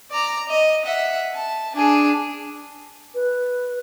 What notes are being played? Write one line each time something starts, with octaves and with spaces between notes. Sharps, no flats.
D5 A#5
D#5
E5 F#5
A5
D4 G#4
B4